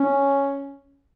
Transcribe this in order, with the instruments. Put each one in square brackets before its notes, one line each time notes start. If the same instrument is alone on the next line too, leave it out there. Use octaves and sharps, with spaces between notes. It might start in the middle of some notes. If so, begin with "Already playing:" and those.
Already playing: [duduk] C#4